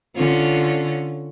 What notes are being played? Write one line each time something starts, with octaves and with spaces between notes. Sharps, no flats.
D3 C#4 F4